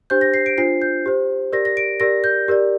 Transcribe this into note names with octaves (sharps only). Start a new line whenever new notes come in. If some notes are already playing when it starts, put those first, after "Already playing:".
D4 G4 C5 G6
A#6
C7
D7
D4 F4 C5 C7
G6
G4 C5
G4 A#4 D5 A#6
A#6
D7
G4 A#4 D5 A#6
G6
G4 A#4 D5